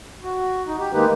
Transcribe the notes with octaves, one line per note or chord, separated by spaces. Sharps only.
F#4
D#4
G4
D#3 G#3 A#3 D#4 G4 B4